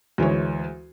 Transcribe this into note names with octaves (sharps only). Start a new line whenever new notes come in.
D2 E3 G#3 C#5